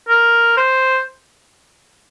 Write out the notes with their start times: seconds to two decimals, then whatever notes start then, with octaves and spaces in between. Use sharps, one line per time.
0.08 A#4
0.57 C5